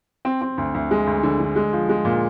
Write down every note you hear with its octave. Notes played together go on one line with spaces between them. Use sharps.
C4
C4
D2
D2
G#3
D2
D3
D3
G#3
F3
G#3
A#2